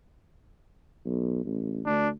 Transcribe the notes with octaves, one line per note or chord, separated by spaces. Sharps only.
B1
A1
D2 D4